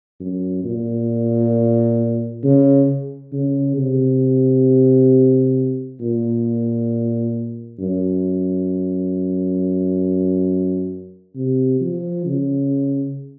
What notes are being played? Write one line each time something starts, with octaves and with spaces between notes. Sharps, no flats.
F#2
A#2
C#3
C#3
C3
A#2
F#2
C3
F3
C#3